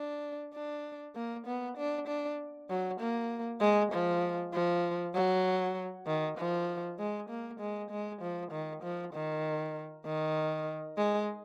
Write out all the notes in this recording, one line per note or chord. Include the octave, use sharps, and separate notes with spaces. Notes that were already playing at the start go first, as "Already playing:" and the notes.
Already playing: D4
D4
A#3
B3
D4
D4
F#3
A#3
G#3
F3
F3
F#3
D#3
F3
G#3
A#3
G#3
G#3
F3
D#3
F3
D#3
D#3
G#3